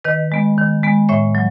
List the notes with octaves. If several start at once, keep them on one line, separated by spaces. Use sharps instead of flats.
D#3 B4 D#5
G#3 B3
D#3
G#3 B3
A2 C#5 E5
F#3